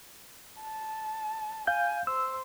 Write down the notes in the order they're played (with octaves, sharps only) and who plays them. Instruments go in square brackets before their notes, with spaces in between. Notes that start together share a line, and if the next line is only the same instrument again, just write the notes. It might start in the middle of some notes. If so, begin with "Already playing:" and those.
[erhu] A5
[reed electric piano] F5 G6 [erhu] G#5
[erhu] C5 [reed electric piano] E6